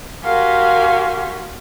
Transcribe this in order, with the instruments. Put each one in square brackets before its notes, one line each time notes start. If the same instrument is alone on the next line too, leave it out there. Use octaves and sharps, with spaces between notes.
[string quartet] F#4 G4 A#4 F5 G#5 C6